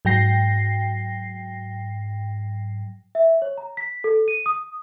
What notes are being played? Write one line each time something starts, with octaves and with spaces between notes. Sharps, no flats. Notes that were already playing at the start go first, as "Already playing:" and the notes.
G#2 F#3 G5 A#6 C7
E5
C#5
A#5
B6
A4
D#7
D#6